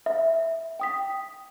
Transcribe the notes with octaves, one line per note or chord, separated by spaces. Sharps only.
E5
G5 D#6 B6